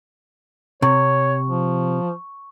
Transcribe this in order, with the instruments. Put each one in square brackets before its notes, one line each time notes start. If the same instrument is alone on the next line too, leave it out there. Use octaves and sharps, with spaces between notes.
[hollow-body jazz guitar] C3 [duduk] C#5 [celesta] C#6
[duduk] F3